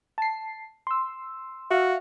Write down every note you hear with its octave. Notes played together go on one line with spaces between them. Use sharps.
A5 C7
C6 E6
F#4 E5 F5 F6